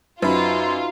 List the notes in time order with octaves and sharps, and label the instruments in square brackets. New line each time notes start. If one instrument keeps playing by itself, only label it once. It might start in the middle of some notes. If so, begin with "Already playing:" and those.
[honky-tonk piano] F#2 [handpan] D#4 F#4 [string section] F4 [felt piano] B4 C5 B5